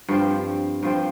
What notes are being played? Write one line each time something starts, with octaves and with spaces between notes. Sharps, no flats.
G2 F3 C4
G2 F3 C4